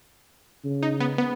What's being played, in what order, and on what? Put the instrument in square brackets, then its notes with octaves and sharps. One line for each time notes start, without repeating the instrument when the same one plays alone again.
[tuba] C#3
[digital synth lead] D#4
B3
B3